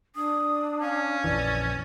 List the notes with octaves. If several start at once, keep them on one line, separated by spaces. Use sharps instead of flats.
D4 D#6
C#4 F5
A#1 F2 E3 D5